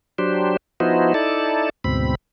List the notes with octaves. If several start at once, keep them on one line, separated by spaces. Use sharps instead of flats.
F#3 D4 G4 C5
F3 B3 D#4 E4 F#4 C5
D#4 E4 A4 D5 A5
D2 G#2 B2 C4 B5